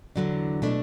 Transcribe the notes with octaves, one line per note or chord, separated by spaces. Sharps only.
E2 D3 F#3 D4
B2 A3 D4 E4 A4